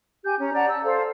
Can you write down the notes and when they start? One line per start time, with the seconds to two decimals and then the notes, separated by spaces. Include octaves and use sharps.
0.24 G4 G#5 G6
0.39 C#4 A#5
0.53 D5 F#5 A5 A#5
0.69 A5 E6
0.82 A4 C5 F5